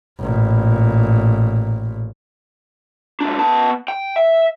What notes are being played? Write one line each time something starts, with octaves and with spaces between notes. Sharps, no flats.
A1 A#2
C#2 D4
B3 A5
G5
E5